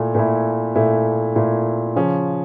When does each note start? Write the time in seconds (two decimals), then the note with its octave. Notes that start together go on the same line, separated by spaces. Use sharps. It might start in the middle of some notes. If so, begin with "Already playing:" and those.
Already playing: A#2 A3 E4
0.15 A#2 A3 E4
0.75 A#2 A3 E4
1.35 A#2 A3 E4
1.95 C#3 F3 C#4